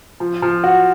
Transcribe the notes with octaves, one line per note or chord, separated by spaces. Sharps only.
F3
F3
F#4